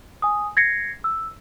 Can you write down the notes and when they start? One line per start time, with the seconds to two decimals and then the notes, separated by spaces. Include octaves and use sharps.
0.22 G#5 D#6
0.57 G#6 A#6 C7 C#7
1.04 E6